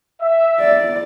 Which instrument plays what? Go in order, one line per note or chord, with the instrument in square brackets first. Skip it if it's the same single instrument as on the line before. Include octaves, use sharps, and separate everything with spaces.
[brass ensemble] E5
[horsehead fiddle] D5